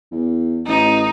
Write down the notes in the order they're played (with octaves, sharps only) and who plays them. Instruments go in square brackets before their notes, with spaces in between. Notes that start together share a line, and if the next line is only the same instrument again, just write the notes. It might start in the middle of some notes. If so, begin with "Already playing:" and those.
[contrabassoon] E2
[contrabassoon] A1 [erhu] D#4